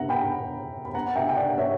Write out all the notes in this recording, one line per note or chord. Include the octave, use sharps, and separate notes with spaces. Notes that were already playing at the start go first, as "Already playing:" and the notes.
Already playing: E5 F#5 A#5
G5 B5
B5
F#5 A#5
E5 G5
G5
D5 F#5
C#5 E5